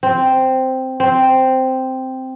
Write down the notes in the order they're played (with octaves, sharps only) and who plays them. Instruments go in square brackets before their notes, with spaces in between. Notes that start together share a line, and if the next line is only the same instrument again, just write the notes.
[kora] C4
C4